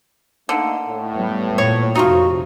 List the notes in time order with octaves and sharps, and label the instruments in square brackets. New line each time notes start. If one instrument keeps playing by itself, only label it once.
[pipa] D3 [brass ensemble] A3 A#3 D#4
[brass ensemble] A2
[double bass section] G3 B3
[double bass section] A#2 [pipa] C#5
[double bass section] F2 C3 [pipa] D#4 F4 [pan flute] F#4